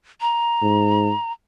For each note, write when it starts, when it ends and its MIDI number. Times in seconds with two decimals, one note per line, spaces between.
0.21 1.32 82
0.62 1.12 44